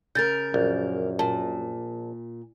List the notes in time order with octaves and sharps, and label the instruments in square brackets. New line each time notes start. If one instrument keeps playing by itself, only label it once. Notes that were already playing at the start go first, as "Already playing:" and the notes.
[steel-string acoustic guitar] C#3 A#4 [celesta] G6 A6
[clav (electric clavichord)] A#1 [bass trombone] F#2
[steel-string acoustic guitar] A#2 [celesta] A5